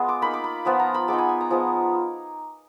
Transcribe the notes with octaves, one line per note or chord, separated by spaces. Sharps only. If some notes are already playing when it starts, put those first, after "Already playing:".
Already playing: G#3 B3 F4
D6
A#3 D#4 B5
D6
B5
F3 B3 F4 G#5
A#5
B5
G#3 B3 D#4 D6
G#5
G#5
A#5
F3 G#3 B3